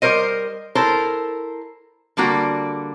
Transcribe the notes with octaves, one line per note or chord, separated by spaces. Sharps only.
G3 A#4 C5 D#5
E4 A4 A#4 C5
D3 G3 A#3 F#4